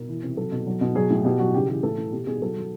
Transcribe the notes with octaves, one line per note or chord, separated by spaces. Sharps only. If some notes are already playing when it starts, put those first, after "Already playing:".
Already playing: B2 A#4
E3
C3
F#3 A4
B2
F#3
B2
F#3 G#4
A2
B2 G4
F#3 F#4
C#3 G4
E3 G4
A2 A4
A2
B2 G4
B2 G#4
F#3 A4
F#3